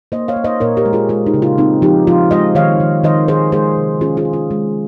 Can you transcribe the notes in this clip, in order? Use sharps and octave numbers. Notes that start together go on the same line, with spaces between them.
A#3 C5 D#5
C#5 F5
A#3
C5 D#5
A#2 A#4 C#5
G4 A#4
G#3
F4 G#4
G#3 F4
D#4 G4
C#3
F4
C4 D#4
F3 D#4 G4
F3 F4
G#3 C5 D#5
D#3 C#5 F5
D#3
D#3 C5 D#5
D#3 G#4 C5
G#3 G#4 C5
C3
C#4 F4 G#4
F4 G#4
C#4
F4
G#3